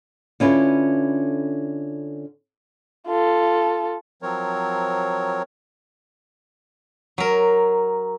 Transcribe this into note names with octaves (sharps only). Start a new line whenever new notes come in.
D3 C#4 E4 F4 B4
F4 A4
F3 F#3 C4 A#4 C#5
F#3 A#4